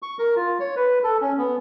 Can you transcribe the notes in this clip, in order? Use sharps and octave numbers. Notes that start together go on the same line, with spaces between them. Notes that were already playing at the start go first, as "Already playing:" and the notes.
C#6
A#4
F4
C#5
B4
A4
C#4
B3